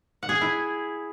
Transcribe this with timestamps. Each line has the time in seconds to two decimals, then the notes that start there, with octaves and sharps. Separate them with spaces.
0.23 F#5
0.29 G#4
0.35 G#5
0.41 E4